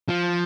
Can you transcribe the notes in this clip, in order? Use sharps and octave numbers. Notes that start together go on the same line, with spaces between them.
F3